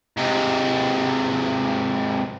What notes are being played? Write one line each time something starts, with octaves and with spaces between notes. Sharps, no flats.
G#2 C3